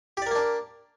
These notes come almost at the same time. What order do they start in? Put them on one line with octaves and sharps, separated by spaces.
G4 D5 A#4 A#3 D4